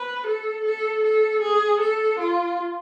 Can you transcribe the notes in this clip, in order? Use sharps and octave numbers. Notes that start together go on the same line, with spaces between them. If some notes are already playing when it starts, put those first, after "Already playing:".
Already playing: B4
A4
A4
A4
G#4
A4
F4